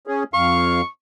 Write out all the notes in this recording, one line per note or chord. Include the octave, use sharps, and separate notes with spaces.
C#4 G#4
F2 F5 C#6